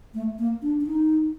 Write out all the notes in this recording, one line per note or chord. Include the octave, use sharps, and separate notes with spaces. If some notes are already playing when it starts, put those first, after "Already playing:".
A3
A#3
D4
D4
D#4